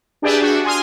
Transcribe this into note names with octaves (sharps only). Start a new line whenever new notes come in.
D4 G4 G#4 B4 D5 E5
D4 F#4
G#5 C6 D#6 F6